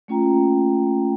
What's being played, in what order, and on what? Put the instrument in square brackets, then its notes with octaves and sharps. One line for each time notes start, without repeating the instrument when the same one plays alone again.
[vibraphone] A3 A#3 C#4 F4 G5 A#5